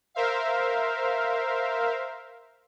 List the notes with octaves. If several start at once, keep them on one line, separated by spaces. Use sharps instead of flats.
A#4 C5 E5 F5